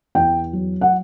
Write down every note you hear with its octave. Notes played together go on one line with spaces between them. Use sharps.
E2 G5
F#3
F#5